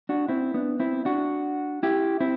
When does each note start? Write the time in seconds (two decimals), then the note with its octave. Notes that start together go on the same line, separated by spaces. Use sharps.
0.09 D4 F#4
0.28 C4 E4
0.54 B3 D4
0.80 C4 E4
1.05 D4 F#4
1.83 E4 G4
2.20 C4 E4